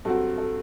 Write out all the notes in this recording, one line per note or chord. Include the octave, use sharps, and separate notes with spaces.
G2 F#3 C4 F#4 A4
A4